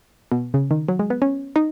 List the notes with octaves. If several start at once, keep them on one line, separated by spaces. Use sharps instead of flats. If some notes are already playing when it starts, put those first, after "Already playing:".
B2
C#3
D#3
F#3
G#3
B3
C#4
D#4